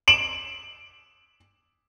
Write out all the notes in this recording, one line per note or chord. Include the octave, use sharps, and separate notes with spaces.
D7 E7 F#7